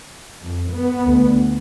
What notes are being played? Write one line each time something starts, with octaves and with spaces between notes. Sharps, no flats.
F2
B3
D2